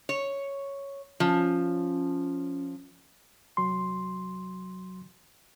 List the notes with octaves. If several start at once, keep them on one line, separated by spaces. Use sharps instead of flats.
C#5
F3 C#4
C2 F#3 C6